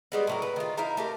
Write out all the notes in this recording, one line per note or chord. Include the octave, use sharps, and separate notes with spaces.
G3 G#3 B3
A2 F#3 A#4
B4
D#3 F4
D#4 E4 E5 F5
A3 G4 A#4